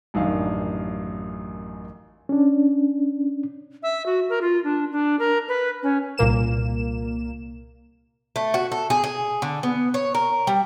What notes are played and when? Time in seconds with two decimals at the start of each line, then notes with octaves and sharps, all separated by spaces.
0.14 A1 F#2 D#3 D4 F5
2.29 C#4 D4
3.83 E5
4.06 F#4
4.29 A#4
4.41 F4
4.64 D4
4.92 D4
5.19 A#4
5.48 B4
5.83 C#4
6.18 C2 A#2 A#3 E7
8.36 A3
8.54 F#4
8.72 A4
8.90 G#4
9.04 G#4
9.42 D3
9.63 B3
9.94 C#5
10.15 A#4
10.47 G3